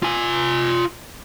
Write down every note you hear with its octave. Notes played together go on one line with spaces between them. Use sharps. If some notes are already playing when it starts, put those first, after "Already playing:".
F4 G#5